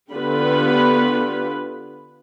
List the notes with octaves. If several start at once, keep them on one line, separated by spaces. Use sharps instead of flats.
D3 B3 F4 G4 B4 B5